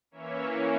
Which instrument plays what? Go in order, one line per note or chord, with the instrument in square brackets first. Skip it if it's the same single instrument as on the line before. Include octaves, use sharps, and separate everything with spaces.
[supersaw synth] E3 A#3 C#4 C#5 E5